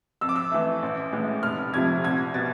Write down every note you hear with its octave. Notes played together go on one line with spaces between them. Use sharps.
F2 E6
D6
E6
E3 A3
A1
A2 E3 G#3
F1 F6
F2 C3 F3 A3 G#6
C2 G#6
B2 A6